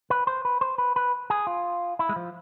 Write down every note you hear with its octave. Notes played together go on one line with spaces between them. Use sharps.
B4
C5
B4
C5
B4
B4
G#4
F4
E4
G#3
F3